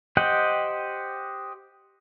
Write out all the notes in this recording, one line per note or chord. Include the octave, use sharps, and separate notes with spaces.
G4 C5 D#5 F#5 G5